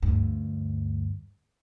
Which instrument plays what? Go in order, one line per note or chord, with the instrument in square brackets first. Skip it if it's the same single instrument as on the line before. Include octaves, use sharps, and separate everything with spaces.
[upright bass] D2 G2